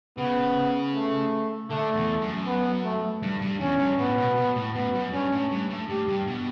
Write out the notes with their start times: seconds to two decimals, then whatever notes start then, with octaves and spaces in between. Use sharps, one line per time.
0.18 C#3 B3
0.94 A3
1.70 D3 A3
1.96 E2
2.21 F#2
2.47 B3
2.84 A3
3.23 G2
3.42 G2
3.60 E2 C#4
3.79 G2
3.99 A2 B3
4.18 B2
4.37 B2
4.55 A2
4.75 F#2 B3
4.94 F#2
5.12 G2 C#4
5.32 A2
5.51 G2
5.70 A2
5.89 G2 G4
6.08 G2
6.27 B2